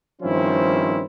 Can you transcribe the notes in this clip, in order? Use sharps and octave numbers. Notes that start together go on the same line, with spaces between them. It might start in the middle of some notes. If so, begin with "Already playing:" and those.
G2 D#3 F3 C4 C#4 E4